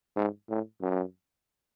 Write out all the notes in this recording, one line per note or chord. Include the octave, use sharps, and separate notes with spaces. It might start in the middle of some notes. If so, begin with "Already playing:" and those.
G#2
A2
F#2